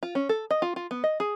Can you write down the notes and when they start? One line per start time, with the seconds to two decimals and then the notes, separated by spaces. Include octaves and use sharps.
0.03 F4
0.15 C#4
0.29 A4
0.51 D#5
0.62 F4
0.76 F4
0.91 B3
1.04 D#5
1.20 G#4